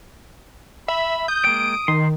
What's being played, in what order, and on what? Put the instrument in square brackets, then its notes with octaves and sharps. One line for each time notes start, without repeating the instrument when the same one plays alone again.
[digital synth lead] E5 [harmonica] B5
[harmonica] D#6 [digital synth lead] G6
[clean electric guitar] G#3 A#3 G5 [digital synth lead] D7
[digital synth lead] D#3 [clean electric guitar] C6